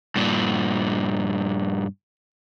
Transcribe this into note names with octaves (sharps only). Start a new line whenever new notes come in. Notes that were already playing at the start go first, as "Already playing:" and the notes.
G2 A#2